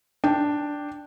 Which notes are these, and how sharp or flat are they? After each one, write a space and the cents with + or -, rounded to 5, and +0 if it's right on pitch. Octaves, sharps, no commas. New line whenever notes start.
D4 +0 G5 +0